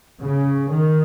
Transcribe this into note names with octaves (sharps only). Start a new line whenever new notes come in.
C#3
D#3